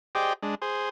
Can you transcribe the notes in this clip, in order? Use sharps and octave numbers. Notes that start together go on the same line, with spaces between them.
G4 G#4 C5 D5 D#5 G5
G#3 D4
G#4 C5